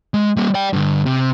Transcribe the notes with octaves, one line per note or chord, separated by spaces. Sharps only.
G#3
G3 A#3
D5 G5
G2 D3
C3